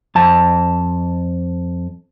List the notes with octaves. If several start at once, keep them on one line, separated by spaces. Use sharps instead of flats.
F2 A5